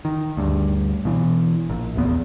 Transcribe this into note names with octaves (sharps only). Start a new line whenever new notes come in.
D#3
D2 G2
B2 E3
A#1
F#1 E2 B3